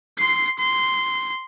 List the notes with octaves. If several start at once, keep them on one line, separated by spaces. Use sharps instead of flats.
C6 C7
C6